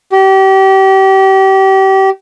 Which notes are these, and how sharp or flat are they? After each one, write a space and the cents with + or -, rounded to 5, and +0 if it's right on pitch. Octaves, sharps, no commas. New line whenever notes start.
G4 -30